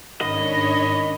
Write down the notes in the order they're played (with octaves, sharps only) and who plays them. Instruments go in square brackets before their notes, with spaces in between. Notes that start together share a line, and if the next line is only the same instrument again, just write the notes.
[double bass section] G#2 [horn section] D#3 C#4 B5 [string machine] D4 C#5 [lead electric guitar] D#5